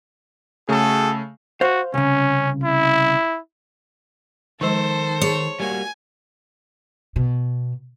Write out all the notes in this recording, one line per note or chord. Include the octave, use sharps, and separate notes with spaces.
C#3 A3 F#4 G#4 A4
F#4 C5 F5
C2 C#3 C#4
E4
D#3 F3 G#3 A4 C5
G#4 C#5
G3 A#3 F#4 G#5
B2